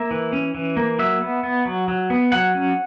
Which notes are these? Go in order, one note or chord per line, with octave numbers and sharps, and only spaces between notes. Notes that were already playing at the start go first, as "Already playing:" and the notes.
Already playing: A#3 E5
E3
C#4
E3
A#3
F#3 E5
B3
B3
F#3
F#3
B3
F#3 F#5
C#4